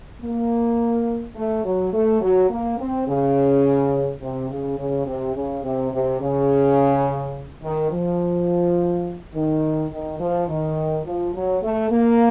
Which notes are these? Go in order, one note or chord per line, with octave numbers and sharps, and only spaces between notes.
A#3
A3
F#3
A3
F#3
A#3
C4
C#3
C3
C#3
C#3
C3
C#3
C3
C3
C#3
D#3
F3
D#3
D#3
F3
D#3
F3
F#3
A3
A#3